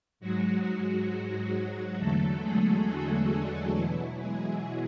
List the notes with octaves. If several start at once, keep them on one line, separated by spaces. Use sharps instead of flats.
G#2 F#3 G#3 F#4
E2 D3 F#3 A3 A4
G#3 G#4
F#3 F#4
D3 D4
B2 E3 F#3 E4
G#3 G#4